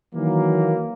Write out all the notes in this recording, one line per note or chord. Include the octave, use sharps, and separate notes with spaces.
D#3 E3 F#3 A#3